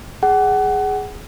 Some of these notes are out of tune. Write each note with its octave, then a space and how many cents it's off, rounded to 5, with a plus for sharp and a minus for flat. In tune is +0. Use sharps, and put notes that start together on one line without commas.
G#4 +0 F#5 +25